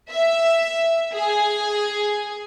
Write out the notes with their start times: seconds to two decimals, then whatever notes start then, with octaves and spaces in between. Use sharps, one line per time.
0.11 E5
1.13 G#4